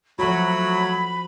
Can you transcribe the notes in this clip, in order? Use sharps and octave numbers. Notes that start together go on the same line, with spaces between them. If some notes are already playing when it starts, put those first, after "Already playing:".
F3 F#3 A3 F#4 B5